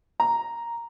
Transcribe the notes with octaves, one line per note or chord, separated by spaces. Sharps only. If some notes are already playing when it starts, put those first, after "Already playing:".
A#5